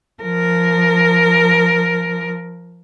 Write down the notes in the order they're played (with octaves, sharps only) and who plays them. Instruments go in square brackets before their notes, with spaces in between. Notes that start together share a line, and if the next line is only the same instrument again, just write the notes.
[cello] F3 A#4